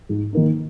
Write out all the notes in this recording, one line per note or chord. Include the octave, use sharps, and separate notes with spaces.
G#2
D#3 A#3 D#4